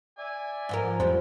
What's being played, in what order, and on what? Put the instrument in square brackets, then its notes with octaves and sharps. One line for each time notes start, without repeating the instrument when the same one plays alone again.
[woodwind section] D5 E5 G#5
[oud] G#2 F3 A#4
[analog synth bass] F2 [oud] F3 G3 [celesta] C5